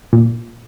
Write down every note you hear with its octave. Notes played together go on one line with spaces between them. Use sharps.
A#2